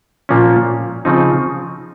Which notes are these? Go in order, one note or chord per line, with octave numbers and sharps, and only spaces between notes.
A#2 F3 A#3 C#4
C#3 F3 C4 D#4